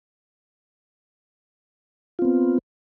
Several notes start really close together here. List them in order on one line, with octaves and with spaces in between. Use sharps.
F4 C4 B3